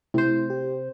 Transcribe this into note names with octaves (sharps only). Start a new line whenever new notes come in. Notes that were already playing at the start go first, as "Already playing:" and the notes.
C3 A3 E4 C5
G4